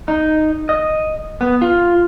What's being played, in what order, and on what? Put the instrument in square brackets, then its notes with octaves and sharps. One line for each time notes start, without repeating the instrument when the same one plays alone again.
[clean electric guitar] D#4
D#5
B3
F4